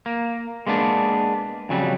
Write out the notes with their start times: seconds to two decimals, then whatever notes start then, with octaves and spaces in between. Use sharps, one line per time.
0.06 A#3
0.67 G#3 A#3 B3 D4
1.69 F2 C#3 F#3 G3